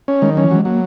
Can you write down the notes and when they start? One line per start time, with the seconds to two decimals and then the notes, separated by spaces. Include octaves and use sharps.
0.08 C#4
0.22 D#3 G#3
0.33 F#3 C#4
0.44 E3
0.51 F#3 G#3
0.65 F#3 A#3